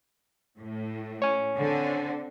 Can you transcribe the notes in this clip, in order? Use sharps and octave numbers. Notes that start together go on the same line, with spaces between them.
A2
C#5 G#5
D3 C4